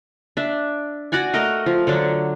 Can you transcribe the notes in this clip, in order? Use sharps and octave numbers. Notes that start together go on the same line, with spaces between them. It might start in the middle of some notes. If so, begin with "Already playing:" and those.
D4 E5
F#4 D5 F#5 G#5
A3 A#4 D#5
F3
D3 F#3 D4